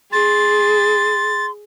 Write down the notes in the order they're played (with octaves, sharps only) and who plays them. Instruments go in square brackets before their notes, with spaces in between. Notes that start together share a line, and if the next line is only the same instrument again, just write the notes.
[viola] G#4 [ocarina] C6 [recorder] A6